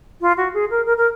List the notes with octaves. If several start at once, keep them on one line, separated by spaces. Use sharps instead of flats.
F4
F#4
G#4
A#4
A#4
A#4